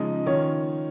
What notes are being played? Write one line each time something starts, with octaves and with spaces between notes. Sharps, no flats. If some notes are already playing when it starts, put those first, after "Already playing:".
Already playing: C#3 F3 G#3 D#4 D#5
D#3 C#4 F4 C#5